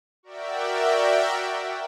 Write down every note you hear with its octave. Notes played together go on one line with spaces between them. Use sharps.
F#4 A#4 D5 E5 G5